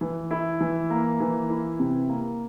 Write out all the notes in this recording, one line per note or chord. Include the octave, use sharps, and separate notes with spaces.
E3
E4
E3
A#3
E3
E4
C3
A#3